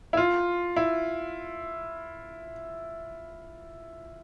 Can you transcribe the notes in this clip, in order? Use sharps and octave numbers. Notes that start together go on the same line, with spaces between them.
E4
F4
E4